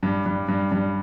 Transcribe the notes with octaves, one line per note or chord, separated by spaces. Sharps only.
G2
G2
G2
G2